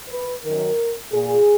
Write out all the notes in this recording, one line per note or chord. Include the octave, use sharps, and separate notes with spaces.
B4
F#2 D#3 A#4
A#2 G#4